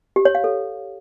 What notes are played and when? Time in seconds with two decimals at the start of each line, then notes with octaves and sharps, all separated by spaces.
0.16 G4
0.25 C#5
0.35 F5
0.44 A4